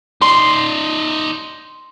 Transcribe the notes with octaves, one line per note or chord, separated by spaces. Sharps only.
D#4 D5 C6